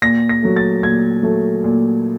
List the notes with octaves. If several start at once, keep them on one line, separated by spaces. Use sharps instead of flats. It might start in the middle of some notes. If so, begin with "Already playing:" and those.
A#2 A#6
A#6
F#3 A3
A6
A#2 G#6
F#3 A3
A#2